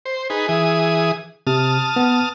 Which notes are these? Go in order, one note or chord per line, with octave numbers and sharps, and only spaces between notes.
C5
D#4 G#4 B4
E3 G#4 D#6
C3 A5 D#6 F6
B3